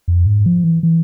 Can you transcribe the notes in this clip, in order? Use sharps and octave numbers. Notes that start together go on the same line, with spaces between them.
F2
G#2
F3
E3
E3